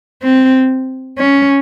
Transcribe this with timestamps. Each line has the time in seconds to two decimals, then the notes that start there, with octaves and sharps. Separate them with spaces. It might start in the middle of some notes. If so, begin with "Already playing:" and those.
0.22 C4
1.18 C#4